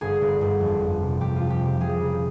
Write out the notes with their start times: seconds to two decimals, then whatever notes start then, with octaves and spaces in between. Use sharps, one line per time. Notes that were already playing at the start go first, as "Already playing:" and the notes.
0.01 G1 G#4
0.21 G1
0.41 G1
0.61 F2
0.80 F2
1.01 C3
1.21 F2 G4
1.36 F3 F4
1.50 G4
1.60 C3 G4
1.80 F3 G#4
2.00 C#3